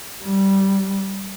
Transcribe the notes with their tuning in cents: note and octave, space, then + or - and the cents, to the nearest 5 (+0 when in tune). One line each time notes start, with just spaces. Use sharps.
G3 -10